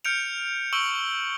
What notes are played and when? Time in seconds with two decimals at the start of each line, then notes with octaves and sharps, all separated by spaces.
0.05 F6 G6 C#7 D7 F7
0.73 C#6 E6 D7 F#7 G7